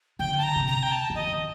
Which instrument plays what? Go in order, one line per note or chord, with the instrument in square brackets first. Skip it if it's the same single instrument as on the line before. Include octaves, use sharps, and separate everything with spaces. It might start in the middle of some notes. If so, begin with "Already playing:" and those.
[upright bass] D3 [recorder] G5
[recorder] A5
A#5
[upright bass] C3
[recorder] A#5
G5
A5
[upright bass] D#3
[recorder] D#5
[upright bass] D#3